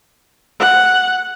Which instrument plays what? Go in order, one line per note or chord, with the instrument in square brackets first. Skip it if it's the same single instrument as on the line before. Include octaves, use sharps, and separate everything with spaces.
[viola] F#5